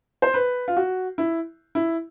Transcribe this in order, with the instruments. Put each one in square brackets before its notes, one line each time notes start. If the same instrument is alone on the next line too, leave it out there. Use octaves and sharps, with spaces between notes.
[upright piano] C5
B4
F4
F#4
E4
E4